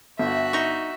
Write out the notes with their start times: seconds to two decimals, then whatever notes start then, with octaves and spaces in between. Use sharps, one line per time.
0.19 G1 F#4 E5
0.53 D#4 C#6